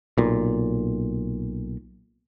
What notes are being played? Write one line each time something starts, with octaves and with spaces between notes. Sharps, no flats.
B1 A#2